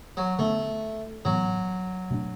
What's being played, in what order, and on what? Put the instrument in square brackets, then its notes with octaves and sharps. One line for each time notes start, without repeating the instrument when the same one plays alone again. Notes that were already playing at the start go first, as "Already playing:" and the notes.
[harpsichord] F#3
[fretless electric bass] D3 B3 D4 [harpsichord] A3
[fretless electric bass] A2 E3 B3 [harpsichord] F#3
[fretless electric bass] B2 A3 D4